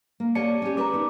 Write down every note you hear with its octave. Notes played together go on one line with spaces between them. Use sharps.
A#3
G4 C#5 D5 F#5 A5 C#7
C#4 G4
A#4 B4 A#5 D6
B3 D#4